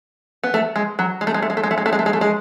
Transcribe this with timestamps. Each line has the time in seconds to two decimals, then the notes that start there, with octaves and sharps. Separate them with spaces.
0.44 B3
0.54 A3
0.76 G#3
0.99 F#3
1.21 G#3
1.27 A3
1.34 G#3
1.42 A3
1.50 G#3
1.57 A3
1.63 G#3
1.71 A3
1.78 G#3
1.86 A3
1.93 G#3
1.99 A3
2.06 G#3
2.13 A3
2.21 G#3